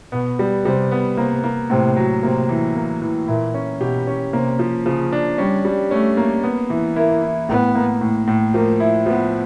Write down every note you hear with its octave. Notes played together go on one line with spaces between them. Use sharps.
B2 B3
G3
C3 G3
B3
C3 A#3
A#3
A2 C3
F#3
C3 A#3
E3
A#3
E3
A#2 E4
C#4
B2 G4
C#4
C3 A#3
F3
C#3 F3
D4
G3 C#4
G3
A3 C#4
A#3
B3
E3
A#3 E4
E4
A2 B3
A#3
A2
A2
F3 A#3
E4
F3 B3